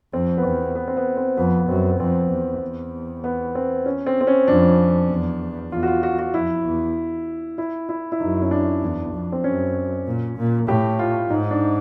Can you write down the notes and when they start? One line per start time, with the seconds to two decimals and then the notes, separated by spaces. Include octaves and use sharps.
0.13 F2 C4
0.37 B3
0.44 E2 C4
0.75 B3
0.87 C4
0.97 B3
1.17 C4
1.37 F2 B3
1.68 F#2 C4
2.00 F2 C4
2.31 E2
2.61 E2
3.24 B3
3.55 C4
3.86 C#4
4.06 C4
4.21 C4
4.27 C#4
4.48 F2 D4
5.10 E2
5.72 E2 F4
5.83 F#4
5.87 F4
6.03 F#4
6.19 F#4
6.34 F2 E4
6.65 E2
7.58 E4
7.89 E4
8.12 E4
8.20 F#2 D#4
8.42 C#4
8.51 D4
8.82 E2
9.13 F2
9.32 C4
9.44 F#2 C#4
10.06 A#2
10.37 A#2
10.68 A2 G4
10.99 F4
11.30 G#2 D#4
11.51 D4